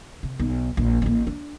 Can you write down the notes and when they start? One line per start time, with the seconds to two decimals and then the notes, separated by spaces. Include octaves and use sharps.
0.23 C3
0.39 B1
0.77 A#1
1.02 A1 A#3
1.27 D4